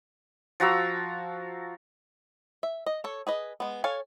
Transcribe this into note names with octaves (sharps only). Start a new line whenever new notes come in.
F3 F#4 A#5 E6
E5
D#5
A4 C#5
G#4 B4 D#5
G#3 B3
A4 C#5 F5 G#5